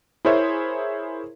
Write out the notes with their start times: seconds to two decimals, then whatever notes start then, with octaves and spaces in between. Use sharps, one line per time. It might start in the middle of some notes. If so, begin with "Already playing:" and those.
0.25 E4 G#4 A#4 C5 C#5 E5